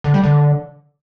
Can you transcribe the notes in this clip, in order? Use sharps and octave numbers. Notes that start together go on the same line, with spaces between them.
D3
G3
D3